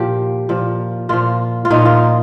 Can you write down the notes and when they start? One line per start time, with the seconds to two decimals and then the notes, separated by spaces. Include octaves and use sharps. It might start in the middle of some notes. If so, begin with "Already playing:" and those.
Already playing: A#2 F3 G4
0.49 A#2 F3
1.09 A#2 F3 F4
1.65 F4
1.70 A#2 F3 D#4
1.85 F4